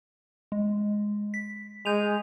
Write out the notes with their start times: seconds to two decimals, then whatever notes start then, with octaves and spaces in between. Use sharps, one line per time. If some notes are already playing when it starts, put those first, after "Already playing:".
0.52 G#3
1.34 B6
1.85 G#3 G6 D#7 F7